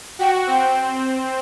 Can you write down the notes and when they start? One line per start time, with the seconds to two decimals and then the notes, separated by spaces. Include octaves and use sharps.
0.19 F#4 G5
0.47 C4 G5